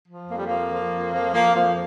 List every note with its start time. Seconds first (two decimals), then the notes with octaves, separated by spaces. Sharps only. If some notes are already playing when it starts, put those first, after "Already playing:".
0.08 F3
0.28 F2 A#3
0.38 G3
0.47 F3 A#3
0.71 F3
0.93 F2
1.13 F3
1.34 F3 A#3
1.56 F2 F3